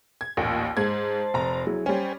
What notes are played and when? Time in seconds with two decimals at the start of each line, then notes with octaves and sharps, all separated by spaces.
0.21 G#6
0.37 A1 D#2 A#2
0.77 G#2 C5 A5 G#6
1.34 F1 A#5
1.67 F#3 E4 G#4
1.86 G3 C#4 C5 G5 G#5